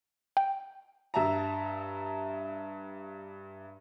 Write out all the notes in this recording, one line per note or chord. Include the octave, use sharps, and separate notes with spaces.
G5
G2 E5 A5 A#5